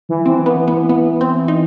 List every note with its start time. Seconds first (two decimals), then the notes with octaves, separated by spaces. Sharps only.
0.09 E3
0.26 E3 C4
0.46 B3
0.68 B3
0.89 B3
1.21 C4
1.48 D#4